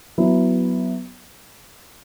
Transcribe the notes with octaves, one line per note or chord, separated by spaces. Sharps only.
F#3 B3 E4